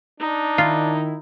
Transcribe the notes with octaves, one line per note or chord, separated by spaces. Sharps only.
D4 D#4
D#3 E4 F4